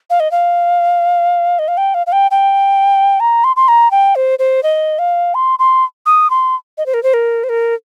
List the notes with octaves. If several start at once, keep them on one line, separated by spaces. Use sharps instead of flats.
F5
D#5
F5
D#5
F5
G5
F5
F5
G5
G5
A#5
C6
C6
A#5
G5
C5
C5
D#5
F5
C6
C6
D#6
C6
D#5
C5
A#4
C5
A#4
C5
A#4